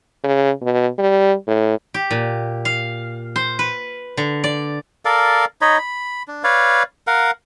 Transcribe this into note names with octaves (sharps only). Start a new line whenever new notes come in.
C#3
B2
G3
A2
G4
A#2
F5
C5
B4
D3
D5
A4 A#4 D5 F5
D#4 C#5 D#5 B5
B5
D4
B4 C#5 D5 F5
A#4 F5 F#5